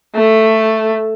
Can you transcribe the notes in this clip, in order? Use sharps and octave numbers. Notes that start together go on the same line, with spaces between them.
A3